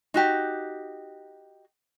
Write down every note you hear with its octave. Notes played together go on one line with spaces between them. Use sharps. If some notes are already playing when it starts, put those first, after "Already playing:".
D#4 F#4 G4